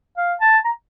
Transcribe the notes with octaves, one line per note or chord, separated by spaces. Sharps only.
F5
A5
A#5